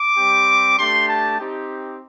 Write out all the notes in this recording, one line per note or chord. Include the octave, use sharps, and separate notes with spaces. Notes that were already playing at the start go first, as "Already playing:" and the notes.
Already playing: D6
G3 C4 G4
A3 D4 G4 C6
A5
C4 D#4 G4